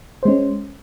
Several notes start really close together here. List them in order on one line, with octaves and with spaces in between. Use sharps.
C5 G#3 C#4